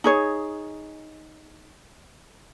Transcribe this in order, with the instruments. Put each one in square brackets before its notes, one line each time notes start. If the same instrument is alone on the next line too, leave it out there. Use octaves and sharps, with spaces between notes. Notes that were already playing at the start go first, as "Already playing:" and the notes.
[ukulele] D#4 G#4 C#5